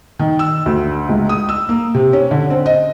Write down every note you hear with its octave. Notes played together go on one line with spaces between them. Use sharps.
D#3
E6
D2
C#2
D#6
E6
A#3
C3
C#4
D3
C4
D#5